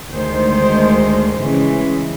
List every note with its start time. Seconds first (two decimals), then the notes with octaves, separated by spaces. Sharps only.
0.11 D2 D#3 G#3 C5
1.37 C#3 E3 G#3